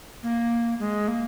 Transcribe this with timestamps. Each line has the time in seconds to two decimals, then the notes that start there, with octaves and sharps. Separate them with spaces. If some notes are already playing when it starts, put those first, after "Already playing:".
0.23 A#3
0.80 G#3
1.08 A#3